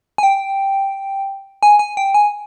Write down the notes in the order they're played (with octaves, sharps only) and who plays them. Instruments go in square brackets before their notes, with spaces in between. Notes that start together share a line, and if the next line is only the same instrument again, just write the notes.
[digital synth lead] G#5
G5
G#5
G#5
G5
G#5